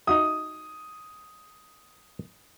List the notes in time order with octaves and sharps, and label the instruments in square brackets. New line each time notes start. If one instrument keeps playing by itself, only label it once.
[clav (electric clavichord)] D#4 F#4 E5 [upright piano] D#6